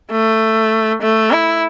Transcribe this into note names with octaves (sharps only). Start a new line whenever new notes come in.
A3
A3
E4